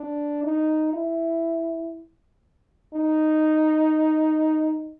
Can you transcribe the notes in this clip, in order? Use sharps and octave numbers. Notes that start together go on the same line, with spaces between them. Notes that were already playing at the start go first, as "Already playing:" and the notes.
Already playing: D4
D#4
E4
D#4